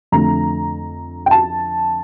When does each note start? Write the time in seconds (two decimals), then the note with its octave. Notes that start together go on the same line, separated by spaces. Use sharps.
0.12 F2 D3 A3 A#5
1.26 G5
1.31 A5